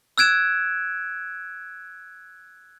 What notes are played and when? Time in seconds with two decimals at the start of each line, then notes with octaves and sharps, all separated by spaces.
0.18 E6 F#6 G#6 D7 E7